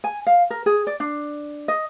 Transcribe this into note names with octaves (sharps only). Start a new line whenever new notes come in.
G#5
F5
A#4
G#4
D5
D4
D#5